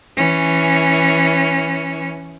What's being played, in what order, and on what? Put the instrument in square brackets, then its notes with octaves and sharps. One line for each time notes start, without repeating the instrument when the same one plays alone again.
[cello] E3 C#4